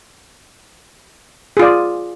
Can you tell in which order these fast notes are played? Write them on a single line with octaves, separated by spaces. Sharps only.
G#4 F4 D5